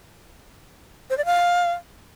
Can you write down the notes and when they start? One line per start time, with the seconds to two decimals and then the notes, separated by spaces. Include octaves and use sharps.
1.10 C5
1.18 D5
1.25 F5